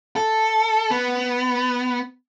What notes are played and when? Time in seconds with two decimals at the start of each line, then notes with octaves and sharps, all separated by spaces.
0.16 A4
0.90 B3